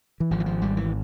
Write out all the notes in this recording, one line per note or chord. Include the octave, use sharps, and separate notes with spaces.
E3
G#1 F3
E3
F3
G#1 G3
E3